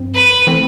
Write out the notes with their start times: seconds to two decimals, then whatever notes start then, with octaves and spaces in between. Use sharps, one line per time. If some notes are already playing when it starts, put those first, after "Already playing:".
Already playing: G2 F3 C4
0.15 B4
0.47 E3 A3 C4